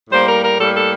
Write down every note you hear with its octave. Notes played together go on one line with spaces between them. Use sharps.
A2 G3 A#3 C5
A#4
A#4
A2 G3 A#3 A4
A4